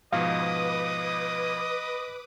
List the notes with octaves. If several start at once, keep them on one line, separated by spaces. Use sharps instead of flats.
G#2 B2 F3 B4 D#5 F5 D6 D#6